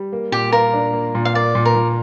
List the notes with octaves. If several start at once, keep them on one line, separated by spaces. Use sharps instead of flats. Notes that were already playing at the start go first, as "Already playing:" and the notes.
Already playing: G3
A#3
A#2 G4
F4 A#4
D4
A#3
A#2
F5
A#3 D5
A#2
A#4
A#2